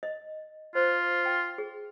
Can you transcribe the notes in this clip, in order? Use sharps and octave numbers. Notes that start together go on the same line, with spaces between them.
D#5
F4 C5
G5
G#4